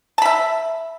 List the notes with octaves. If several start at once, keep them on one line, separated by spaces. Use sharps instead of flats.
E5 A5 B5